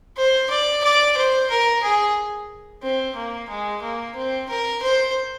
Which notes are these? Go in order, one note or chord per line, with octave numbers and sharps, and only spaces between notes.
C5
D5
D5
C5
A#4
G#4
C4
A#3
G#3
A#3
C4
A#4
C5